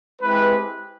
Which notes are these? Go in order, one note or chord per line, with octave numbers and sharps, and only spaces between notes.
G#3 C4 E4 G4 B4